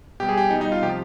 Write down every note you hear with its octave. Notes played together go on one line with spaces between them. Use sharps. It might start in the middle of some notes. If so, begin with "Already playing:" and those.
B2 G3 G4
G#4
G4
B2 G3 D#4
D#4
F4
C3 F3 G4